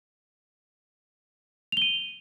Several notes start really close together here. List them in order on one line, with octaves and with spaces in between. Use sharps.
F7 G7 D#7